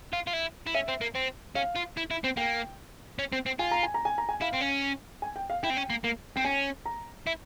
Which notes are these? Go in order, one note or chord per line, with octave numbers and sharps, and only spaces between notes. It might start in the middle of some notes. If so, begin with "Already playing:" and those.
F4
F4
E4
E4
C#4 E5
C4
A#3
C4
C#4 F5
F4
E4
E4
C4
A#3 G5
C#4
C4
C4
F4 G#5
A#5
G#5
A#5
G#5
A#5
G#5
E4 F5
C4
C#4
G#5
G5
F5
E4 G5
C4
C#4
A#3
A#3
C4 G5
C#4 G#5
A#5
E4